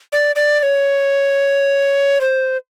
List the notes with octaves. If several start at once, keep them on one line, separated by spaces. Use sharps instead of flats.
D5
D5
D5
C#5
C5